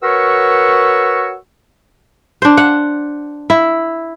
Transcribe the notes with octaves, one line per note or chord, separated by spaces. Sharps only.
F#4 A#4 B4 C#5 C#6 E6
D4 C5
F#5
E4